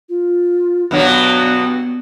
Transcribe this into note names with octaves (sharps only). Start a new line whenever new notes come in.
F4
G2 B2 F#3 B3